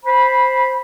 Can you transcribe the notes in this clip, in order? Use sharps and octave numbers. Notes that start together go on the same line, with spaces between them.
C5 B5